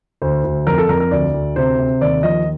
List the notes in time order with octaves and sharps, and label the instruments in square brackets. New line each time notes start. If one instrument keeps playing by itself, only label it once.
[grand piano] D2 C5
D2
F2 A#4
A4
F2 A#4
A#4
D2 D5
D2
C3 C5
C3
D#2 D5
F3 D#5